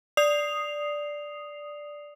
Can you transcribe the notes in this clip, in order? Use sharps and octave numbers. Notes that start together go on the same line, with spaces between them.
D5 D#6 C7 F7